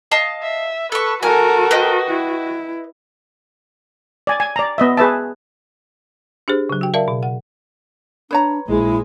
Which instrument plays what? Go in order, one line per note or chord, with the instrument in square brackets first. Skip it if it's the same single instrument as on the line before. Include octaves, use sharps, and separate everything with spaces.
[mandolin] D#5 F5 A5
[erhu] E5
[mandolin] A4 C#6 [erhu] B4
[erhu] F#4 [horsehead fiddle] A4 A#4 [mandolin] G#5
[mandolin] B4 D#5 G5
[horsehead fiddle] E4
[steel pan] D5 G#5
G#5
D5 A#5
B3 D#5 E5
G#4 B4 E5 A5
[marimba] D4 G4 G#4 C5
C#3 F#3
F#4 G5
A#4 D5 E5 F5 A5
B2
F#5
[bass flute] D4 [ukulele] B4 C#5 A#5
[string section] A#1 G#3 [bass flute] E4